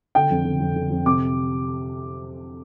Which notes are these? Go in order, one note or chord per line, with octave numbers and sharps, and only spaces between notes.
D3 G5
F2
D3
F2
D3
F2
C3 D6